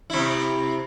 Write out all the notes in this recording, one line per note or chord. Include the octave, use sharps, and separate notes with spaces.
C3 E4